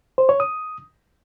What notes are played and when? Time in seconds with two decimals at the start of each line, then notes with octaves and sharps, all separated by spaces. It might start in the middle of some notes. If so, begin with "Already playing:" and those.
0.18 C5
0.29 C#5
0.40 D#6